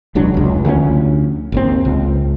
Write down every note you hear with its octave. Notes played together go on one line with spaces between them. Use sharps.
E1 C#2 F#3 D4
F1 C#2
D2 F3 G3 C#4
G#1 D#2 C4
C#2